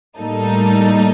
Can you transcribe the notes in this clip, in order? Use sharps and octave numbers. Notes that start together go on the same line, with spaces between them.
A2 G3 A#3 D#4 A4